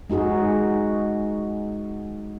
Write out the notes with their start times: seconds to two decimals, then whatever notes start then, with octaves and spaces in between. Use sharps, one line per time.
0.10 G#3 D#4 F#4 G#4